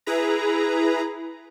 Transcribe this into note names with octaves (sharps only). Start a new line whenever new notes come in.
E4 G#4 B4 A#5